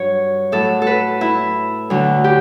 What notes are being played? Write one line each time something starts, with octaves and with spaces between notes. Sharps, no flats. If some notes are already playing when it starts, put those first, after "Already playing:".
Already playing: G2 F#3 C#5
A2 F#3 A4
A4 B4
E4
D2 D3 F#3
G4